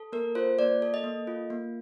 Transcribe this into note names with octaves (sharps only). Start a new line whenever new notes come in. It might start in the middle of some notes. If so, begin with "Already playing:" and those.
Already playing: A4
A#3 A#4
F4 C5
A#3 D5
A4
D#5
A#3
F4
A#3